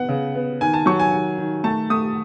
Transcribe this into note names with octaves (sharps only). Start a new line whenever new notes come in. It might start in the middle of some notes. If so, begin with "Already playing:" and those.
Already playing: B3 F#5
C#3
B3
D#3 G#5
A5
F#3 C#6
G#5
D#3
D#3
A3 A5
A3 D#6